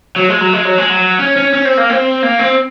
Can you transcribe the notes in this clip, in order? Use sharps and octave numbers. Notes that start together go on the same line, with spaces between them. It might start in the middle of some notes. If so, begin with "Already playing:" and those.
F#3
G#3
F#3
G#3
F#3
G#3
F#3
C#4
C#4
C#4
C4
A#3
C4
A#3
C4